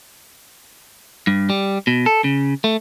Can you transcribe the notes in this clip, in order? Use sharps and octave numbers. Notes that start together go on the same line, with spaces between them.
G2
G3
B2
A4
C#3
A3